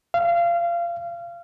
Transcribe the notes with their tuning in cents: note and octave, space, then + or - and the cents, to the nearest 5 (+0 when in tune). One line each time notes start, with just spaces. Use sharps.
F5 -25